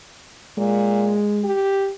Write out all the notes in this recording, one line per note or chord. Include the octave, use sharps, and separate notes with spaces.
A#2 G#3
G4